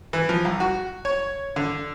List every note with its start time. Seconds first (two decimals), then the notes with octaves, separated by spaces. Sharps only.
0.13 E3
0.29 F3
0.45 C2
0.60 F#4
1.05 C#5
1.56 D3